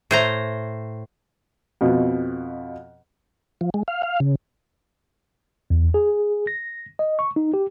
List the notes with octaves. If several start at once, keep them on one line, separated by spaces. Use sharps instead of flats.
A2 C5 A#5
F2 B2
F3
G#3
F5
F5
C#3
E2
G#4
A#6
D#5
C#6
D#4
G4